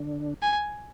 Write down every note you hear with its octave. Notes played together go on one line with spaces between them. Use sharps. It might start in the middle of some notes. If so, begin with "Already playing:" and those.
Already playing: D3 D4
G#5